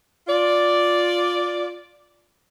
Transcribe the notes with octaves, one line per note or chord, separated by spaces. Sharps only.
F4 D5